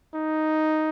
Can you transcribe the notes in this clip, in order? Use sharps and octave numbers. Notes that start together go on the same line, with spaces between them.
D#4